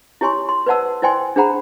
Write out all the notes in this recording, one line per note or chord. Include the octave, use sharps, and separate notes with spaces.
E4 G4 C#5 G#5 C6 C#6
C6
B4 C5 D5 F#5 A5 E6
E4 C5 D5 G5 G#5 C6
D4 G#4 C5 F#5 A#5 B5